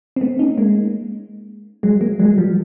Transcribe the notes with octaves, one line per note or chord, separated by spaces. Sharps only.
C4
A3 B3
C#4 D#4
G#3 A#3
F#3 G#3
G#3 A#3
F#3 G#3
F3 G3